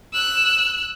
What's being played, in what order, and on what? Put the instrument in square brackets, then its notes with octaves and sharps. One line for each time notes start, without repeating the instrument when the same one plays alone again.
[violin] E6 F#6